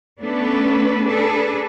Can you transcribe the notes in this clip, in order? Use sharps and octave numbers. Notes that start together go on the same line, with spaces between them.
A3 B3 C#4 D4 A4 B4
D4 G#4 A4 B4